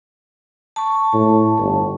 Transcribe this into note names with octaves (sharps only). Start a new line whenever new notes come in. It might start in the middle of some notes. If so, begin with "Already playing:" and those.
A5 C#6
A2
G1